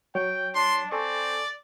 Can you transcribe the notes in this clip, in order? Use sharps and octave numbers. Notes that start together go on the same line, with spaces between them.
F#3 C#5 G5
D4 C6
C4 A4 D5 G#5 C#6